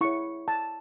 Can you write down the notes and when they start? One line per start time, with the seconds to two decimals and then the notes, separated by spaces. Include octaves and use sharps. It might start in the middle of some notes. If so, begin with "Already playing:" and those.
0.01 E4 G#4 C#5 C#6
0.48 A5